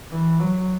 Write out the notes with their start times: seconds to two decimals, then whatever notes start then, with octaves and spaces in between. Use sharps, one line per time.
0.11 E3
0.40 F#3